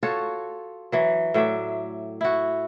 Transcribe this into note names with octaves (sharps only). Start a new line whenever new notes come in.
F4 F#4 A4 C#5
E3 F#3
A2 F#3 D5 E5
E4 F#4